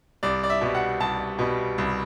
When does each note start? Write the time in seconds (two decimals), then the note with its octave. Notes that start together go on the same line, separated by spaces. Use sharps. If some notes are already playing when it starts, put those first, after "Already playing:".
0.23 C2 D5
0.43 D5
0.50 E5
0.61 B2 G3
0.75 F#5
1.00 C2 A5
1.39 B2 G3
1.78 C2